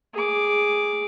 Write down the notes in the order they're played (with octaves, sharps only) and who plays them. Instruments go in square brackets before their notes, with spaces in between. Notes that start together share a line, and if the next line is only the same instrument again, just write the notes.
[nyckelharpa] G#4 D6